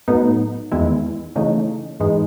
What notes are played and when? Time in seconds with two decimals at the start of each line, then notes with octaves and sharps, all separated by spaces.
0.08 A2 F#3 B3 D#4
0.71 E2 D#3 G#3 B3 E4
1.35 C#3 E3 A3 D#4
2.00 G#2 E3 G#3 D#4